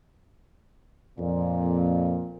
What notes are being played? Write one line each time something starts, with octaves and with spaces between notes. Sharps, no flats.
F2 A#2